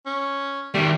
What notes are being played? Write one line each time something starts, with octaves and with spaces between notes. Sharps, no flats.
C#4
D#3 G3 A3